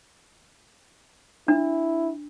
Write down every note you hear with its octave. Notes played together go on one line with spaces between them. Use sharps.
D4 E4